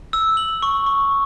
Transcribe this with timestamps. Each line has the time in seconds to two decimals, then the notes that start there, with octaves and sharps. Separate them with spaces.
0.13 E6
0.37 F#7
0.62 C#6
0.86 C#6